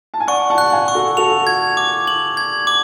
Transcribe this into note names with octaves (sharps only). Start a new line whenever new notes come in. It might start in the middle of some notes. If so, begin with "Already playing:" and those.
A5
G#5
D5 F#5 C#6
F#5 A5
F#6
F5 G#5
C#6
F#4 A4
F#4 A4 F7
G#6
D6
F#7
G#6
D6